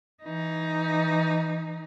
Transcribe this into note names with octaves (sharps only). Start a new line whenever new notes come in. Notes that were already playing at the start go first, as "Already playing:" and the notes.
E3 D#4